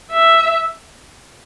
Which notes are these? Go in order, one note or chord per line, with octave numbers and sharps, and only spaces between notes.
E5